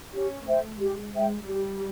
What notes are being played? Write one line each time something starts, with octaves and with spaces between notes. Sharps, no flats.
C#4 G4
A3 C5 E5 G5
G#3 G4
G#3 C5 E5 G5
G3 G4